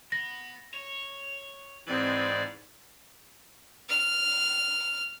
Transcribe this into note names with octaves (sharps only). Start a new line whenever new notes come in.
B3 A#6
C#5
G#2 E3 G#3 C4 B4 D5
F6